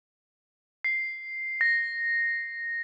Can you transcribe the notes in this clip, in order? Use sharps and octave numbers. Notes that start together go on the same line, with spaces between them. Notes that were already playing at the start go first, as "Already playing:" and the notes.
C7
A#6